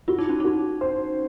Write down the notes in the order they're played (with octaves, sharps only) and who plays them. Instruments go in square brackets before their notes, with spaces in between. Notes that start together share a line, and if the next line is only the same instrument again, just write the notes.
[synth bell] F4 [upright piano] F#4
[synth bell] D#4
C#4
[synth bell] D#4 [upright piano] F#4
[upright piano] C5